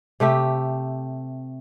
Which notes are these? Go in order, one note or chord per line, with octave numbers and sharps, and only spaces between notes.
C3 A3 G4 E5